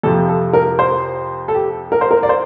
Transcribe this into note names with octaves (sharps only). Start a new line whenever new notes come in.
F2 C3 F3 A4
A4
A#4
C5
A4
G4
A#4
C5
A#4
D5
C5